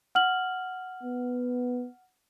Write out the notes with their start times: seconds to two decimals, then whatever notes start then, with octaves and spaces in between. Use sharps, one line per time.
0.15 F#5 F6 F#7
1.03 B3